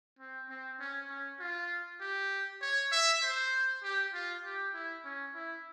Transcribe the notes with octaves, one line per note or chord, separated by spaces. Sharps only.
C4
C4
C#4
C#4
F4
G4
C#5
E5
C5
G4
F4
G4
E4
C#4
E4